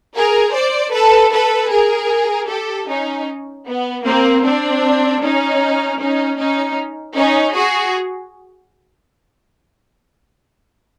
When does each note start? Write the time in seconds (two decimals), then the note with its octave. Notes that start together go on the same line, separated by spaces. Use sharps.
0.16 G#4 A#4
0.55 C5 D5
0.94 A4 B4
1.32 A4 B4
1.71 G#4 A#4
2.49 G4 A4
2.88 C#4 D#4
3.67 B3
4.05 A#3 C4
4.43 C4 D4
5.22 C#4 D#4
5.99 C#4 D#4
6.38 C#4 D#4
7.16 C#4 D#4
7.55 F#4 G#4